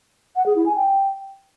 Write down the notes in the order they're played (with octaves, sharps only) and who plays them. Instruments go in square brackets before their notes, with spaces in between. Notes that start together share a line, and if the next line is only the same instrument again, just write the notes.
[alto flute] F#5
G#4
E4
G#5
G5